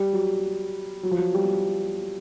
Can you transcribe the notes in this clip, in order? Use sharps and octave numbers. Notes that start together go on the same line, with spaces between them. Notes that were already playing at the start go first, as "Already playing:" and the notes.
Already playing: G3
F#3
F#3
F3
F#3
G3